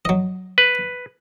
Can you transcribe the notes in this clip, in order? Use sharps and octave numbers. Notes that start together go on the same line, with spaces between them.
F#3 D#5
B4